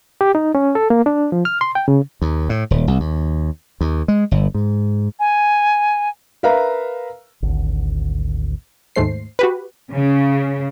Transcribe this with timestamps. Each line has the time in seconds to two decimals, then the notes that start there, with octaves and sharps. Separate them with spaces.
0.21 G4
0.35 D#4
0.55 C#4
0.75 A4
0.90 A#3
1.06 D4
1.32 F3
1.45 F6
1.61 C6
1.75 G5
1.88 C#3
2.22 D#2
2.49 A2
2.71 D#1
2.88 C2
3.00 D#2
3.81 D#2
4.08 G#3
4.31 G1
4.54 G#2
5.20 G#5
6.43 A#4 B4 E5 F5 A#5
7.42 G#1 D2
8.96 D#2 G#2 G#3 A3 C5 C7
9.39 F#4 G4 B4
9.92 C#3